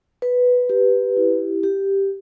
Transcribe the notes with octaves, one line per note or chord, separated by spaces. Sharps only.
B4
G4
E4
G4